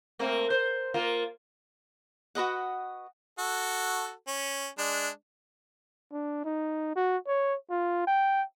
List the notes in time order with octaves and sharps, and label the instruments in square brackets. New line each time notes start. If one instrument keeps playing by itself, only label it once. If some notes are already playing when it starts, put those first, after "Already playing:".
[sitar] A3 A#3 C4
C5
A#3 F4
[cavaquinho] F#4 B4 D#5 F#5
[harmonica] F#4 A4
C#4
G#3 D4
[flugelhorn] D4
D#4
F#4
C#5
F4
G5